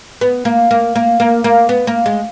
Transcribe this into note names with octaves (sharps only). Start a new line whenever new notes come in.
B3
A#3
A#3
A#3
A#3
A#3
B3
A#3
G#3